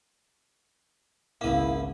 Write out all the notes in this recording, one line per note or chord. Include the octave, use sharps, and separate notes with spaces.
G#1 C#2 A#3 E4 B4 F5